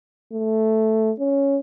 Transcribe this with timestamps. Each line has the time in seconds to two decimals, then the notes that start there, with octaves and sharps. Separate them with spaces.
0.33 A3
1.19 C#4